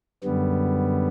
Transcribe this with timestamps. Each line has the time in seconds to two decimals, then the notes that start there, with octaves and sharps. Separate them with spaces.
0.24 F#2 D3 G3 B3